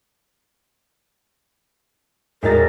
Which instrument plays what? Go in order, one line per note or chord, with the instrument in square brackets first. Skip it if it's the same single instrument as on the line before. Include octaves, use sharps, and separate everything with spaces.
[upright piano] E1 D#4 A6 [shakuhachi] A#4